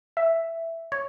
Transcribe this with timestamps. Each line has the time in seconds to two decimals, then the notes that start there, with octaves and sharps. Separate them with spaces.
0.17 E5
0.92 C#5